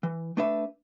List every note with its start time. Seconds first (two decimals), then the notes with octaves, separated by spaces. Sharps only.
0.03 E3
0.37 A3 D4 B4 E5